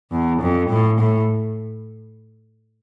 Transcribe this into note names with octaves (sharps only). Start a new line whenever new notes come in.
E2
F2
A2
A2